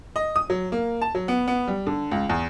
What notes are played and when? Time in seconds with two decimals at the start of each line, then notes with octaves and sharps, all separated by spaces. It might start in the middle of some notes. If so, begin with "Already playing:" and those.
0.16 D#5
0.36 D#6
0.50 F#3
0.72 A#3
1.02 A5
1.15 F#3
1.28 B3
1.48 B3
1.67 G3
1.87 D3
2.11 C#2
2.29 E2